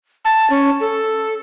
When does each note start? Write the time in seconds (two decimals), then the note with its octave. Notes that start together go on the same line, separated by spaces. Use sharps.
0.25 A5
0.50 C#4
0.80 A4